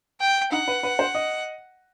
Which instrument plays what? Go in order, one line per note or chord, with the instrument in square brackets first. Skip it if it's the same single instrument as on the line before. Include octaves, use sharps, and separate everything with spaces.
[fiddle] G5
[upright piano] D#4 [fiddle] F#5
[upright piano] B4
B4
C5
D#5